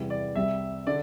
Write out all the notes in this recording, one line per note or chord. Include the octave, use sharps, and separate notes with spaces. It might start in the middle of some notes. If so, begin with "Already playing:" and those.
Already playing: E2 C3 E3 G3
D5
C2 C3 G3 E5
D3 D5